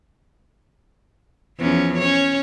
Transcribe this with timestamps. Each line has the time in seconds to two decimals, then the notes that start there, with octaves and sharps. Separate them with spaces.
1.59 E2 F3 C#4
1.98 C#4 C#5